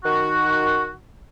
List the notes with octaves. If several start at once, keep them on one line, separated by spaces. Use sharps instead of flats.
D#3 F#4